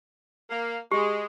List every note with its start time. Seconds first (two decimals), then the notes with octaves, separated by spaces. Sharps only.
0.50 A#3
0.92 G#3 G4